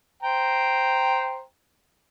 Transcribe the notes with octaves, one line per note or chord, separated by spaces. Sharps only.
C5 G5 A#5